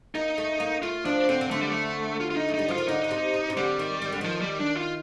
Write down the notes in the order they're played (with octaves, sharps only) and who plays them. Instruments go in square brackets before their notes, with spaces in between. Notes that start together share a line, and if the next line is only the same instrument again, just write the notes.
[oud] A#3 [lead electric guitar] D#4
[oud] A3
A#3
[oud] A3 [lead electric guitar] F4
[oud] F3 [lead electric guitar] D4
[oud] D3 [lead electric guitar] C4
[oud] C3
[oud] D3 [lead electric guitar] A3
[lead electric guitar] G3
A3
F4
F4
D#4
[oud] A3
[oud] G3 [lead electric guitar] D#4
[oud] F3 [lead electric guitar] F4
[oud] D#3
[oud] D3 [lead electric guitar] D#4
[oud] D3
C3
C3
C3
[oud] D3 [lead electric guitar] G3
[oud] D#3
D#3
D3
[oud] D#3 [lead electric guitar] F3
[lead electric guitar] G3
D4
F4